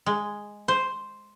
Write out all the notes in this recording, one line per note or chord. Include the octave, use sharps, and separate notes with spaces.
G#3
C5